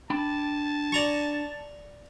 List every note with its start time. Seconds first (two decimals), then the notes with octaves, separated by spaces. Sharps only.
0.10 D4 G5 A5 B5
0.92 D5 A#5 C#6